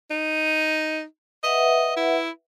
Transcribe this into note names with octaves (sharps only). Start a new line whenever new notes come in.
D#4
B4 D#5 E5 F#5
E4